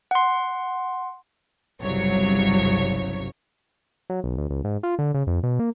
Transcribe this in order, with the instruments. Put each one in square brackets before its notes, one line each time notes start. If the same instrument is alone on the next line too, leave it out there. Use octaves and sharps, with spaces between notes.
[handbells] F#5 C6
[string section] G1 C2 C#3 F#3 C#5
[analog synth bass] F#3
B1
D2
C#2
G#2
F4
D3
C#3
F2
B2
A#3